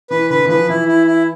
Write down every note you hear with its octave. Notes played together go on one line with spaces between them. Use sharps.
E3 B4
D3 B4
E3
F3 B4
E3 E4
E4
E4